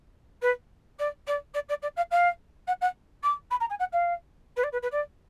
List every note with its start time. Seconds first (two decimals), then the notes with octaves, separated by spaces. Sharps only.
0.42 B4
0.99 D5
1.27 D5
1.54 D5
1.69 D5
1.82 D5
1.96 F5
2.11 F5
2.67 F#5
2.81 F#5
3.23 D6
3.51 B5
3.60 A#5
3.70 G#5
3.79 F#5
3.93 F5
4.57 B4
4.63 D5
4.72 B4
4.82 B4
4.91 D5